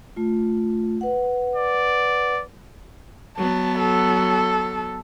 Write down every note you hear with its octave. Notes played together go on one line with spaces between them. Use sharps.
A3 F4
B4 F#5
D5
F#3 B3 A5
A4